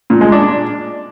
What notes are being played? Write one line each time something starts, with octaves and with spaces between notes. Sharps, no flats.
A#2
G#3
D4